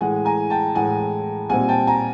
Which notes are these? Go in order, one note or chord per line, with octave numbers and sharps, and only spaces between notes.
A2 E3 G#3 F#5 G#5
G#5 A#5
G5 A5
A2 E3 G#3 F#5 G#5
A#2 G3 C4 D#4 F#5 G#5
G5 A5
G#5 A#5